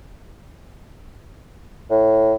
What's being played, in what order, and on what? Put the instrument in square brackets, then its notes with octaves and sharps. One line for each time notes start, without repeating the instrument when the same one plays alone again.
[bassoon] A2